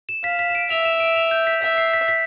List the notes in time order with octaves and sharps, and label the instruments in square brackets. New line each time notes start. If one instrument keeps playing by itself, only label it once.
[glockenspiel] E7
[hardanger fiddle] F5 [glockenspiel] B6
[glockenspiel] B6
E7
D7
[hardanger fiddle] E5 [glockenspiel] F7
[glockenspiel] E7
D7
F7
G6
B6
[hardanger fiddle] E5 [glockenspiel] B6
[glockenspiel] C7
B6
B6